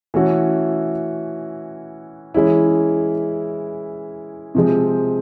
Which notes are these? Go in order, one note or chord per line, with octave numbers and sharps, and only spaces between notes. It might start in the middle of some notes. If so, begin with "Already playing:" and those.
E3 A3 C#4 F#4 A4
E3 G#3 C#4 E4
C3 F3 G#3 C4